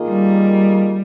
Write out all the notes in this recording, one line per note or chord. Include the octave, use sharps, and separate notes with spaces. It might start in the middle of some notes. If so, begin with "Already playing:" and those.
Already playing: D#3 A#3 F4 G#4 D#5
G3